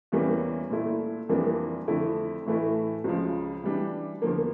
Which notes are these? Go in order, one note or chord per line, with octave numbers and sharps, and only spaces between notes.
E2 E3 G3 A#3 C#4
A#2 A3 E4
F2 E3 G3 A#3 D4
F2 D3 A3 E4
A2 E3 A3 E4
C#2 C#3 F3
E3 G3 D4
E2 D3 F3 A#3